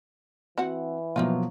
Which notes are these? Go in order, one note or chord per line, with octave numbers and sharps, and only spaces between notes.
E3 C4 F#4 F#5
B2 F3 F#3 A#3 D#4 F4